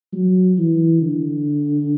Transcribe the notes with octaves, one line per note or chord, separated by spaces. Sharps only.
F#3
E3
D3